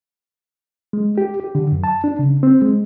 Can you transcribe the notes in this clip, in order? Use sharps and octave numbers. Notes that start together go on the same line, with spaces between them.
G#3
G4
G4
D3
F#2
A5
D4
C#3
C4
G#3